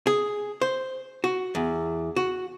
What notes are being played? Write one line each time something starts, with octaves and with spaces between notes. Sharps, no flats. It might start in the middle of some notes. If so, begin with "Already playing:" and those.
G#4
C5
F#4
E2
F#4